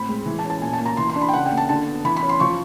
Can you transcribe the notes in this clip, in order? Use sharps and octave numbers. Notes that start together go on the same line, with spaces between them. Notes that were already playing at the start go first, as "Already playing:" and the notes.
Already playing: A2 C4 B5
G#3
E3
A5
C#4
A5
A#2 G#5
A5
A#3
A#5
E3 C6
C6
D4
B5
G5
C#3 F#5
G5
A#3
A5
D3 A5
B3
E3 B5
B5
C#4
C6
F3 C#6